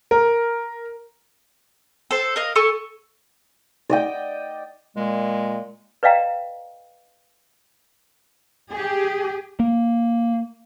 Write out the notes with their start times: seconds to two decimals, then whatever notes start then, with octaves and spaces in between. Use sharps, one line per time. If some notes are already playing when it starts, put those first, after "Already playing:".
0.11 A#4
2.11 A4 C5
2.36 A#4 D#5 F5
2.56 A4 G#5 C#6
3.89 D5 D#5 G5
4.97 A#2 G#3
6.03 B4 D5 D#5 F5 G5 A#5
8.72 G4 G#4
9.60 A#3